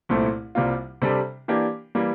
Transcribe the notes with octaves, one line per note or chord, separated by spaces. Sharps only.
C2 A#2 A3 C4 E4
C2 C3 G3 A#3 F4
C3 G3 D4 A4
E3 A#3 D4 G4
E3 G3 A#3